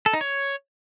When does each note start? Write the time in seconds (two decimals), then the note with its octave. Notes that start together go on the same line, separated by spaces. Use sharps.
0.06 A4
0.13 D#4
0.21 C#5